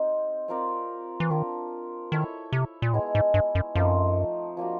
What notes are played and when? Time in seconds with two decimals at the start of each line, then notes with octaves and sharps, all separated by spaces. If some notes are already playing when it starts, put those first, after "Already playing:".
Already playing: C4 D#4 G4
0.48 C4 F4 A#4 D5
1.20 E3
1.30 D#3 D4 F4 A#4
2.12 D#3 E4 A4 C#5 E5
2.53 C3
2.82 A#2
2.93 A2 G#3 B3 E4 G#4
3.15 G#2
3.34 G2
3.55 F#2
3.75 F#2 F3 A3 C4 D#4
4.57 F3 A#3 D4 F#4